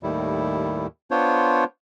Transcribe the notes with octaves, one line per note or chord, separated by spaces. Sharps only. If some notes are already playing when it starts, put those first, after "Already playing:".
D#2 A2 D#3 G3 E4
B3 D4 F4 C5 C#5